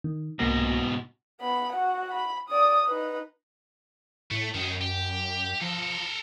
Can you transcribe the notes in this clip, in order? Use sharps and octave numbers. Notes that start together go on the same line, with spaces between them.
D#3
C2 G#2 B2 A#3 A#6
B3 B5
F#4 F#5
B5
D5 D#6
D#4 B4
A2 A3
F#2 D#3 C#4
G4
F3 A4 A#4